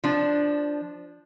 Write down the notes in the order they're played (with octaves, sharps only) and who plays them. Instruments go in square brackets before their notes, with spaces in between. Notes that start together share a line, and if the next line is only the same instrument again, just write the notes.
[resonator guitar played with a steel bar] F3 D4